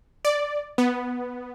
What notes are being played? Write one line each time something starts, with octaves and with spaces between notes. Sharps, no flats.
D5
B3